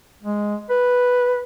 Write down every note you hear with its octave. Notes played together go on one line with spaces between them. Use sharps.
G#3
B4